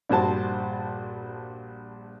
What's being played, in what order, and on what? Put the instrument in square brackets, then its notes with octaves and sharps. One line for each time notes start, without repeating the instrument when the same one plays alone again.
[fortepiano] A#1 G2 F#4 C5 A5